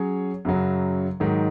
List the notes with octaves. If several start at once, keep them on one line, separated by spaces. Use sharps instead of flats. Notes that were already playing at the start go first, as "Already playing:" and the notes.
Already playing: F#3 C#4 G#4 C#5
F#2 C#3 F#3
G#2 D#3 F#3